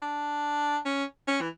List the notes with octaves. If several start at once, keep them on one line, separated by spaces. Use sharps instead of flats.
D4
C#4
C#4
E3